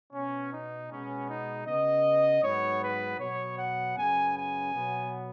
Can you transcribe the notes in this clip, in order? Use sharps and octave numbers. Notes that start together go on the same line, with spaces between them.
B2 B3 C#4
D#4
B2 G#3 B3 C#4
D#4
C#3 B3 D#5
G#2 F#3 B3 C#5
B4
B2 F#3 B3 C#5
F#5
F#2 C#3 B3 G#5
G#5
B2 F#3 B3